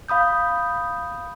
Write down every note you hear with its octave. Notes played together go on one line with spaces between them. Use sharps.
F5 B5 D#6 G6